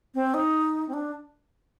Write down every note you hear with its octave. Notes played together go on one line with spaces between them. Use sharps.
C4
D#4
C4
D4